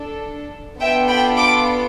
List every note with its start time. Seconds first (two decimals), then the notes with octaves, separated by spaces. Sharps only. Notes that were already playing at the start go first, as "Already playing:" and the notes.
Already playing: D4 A4
0.81 B3 D4 F4 A4 E5 G5
1.09 G5 B5
1.37 B5 D6